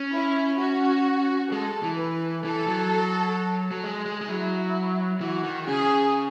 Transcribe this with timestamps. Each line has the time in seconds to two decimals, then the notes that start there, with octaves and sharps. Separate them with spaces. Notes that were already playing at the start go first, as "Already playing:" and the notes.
Already playing: C#4
0.14 E4
0.60 F#4
1.52 G#3 A4
1.83 E3
1.98 B4
2.45 E3 A4
2.68 F#3
3.71 F#3
3.83 G#3 G#4
4.06 G#3
4.21 G#3
4.29 F#3 E4
5.21 E3 F#4
5.44 D#3
5.67 C#3 G#4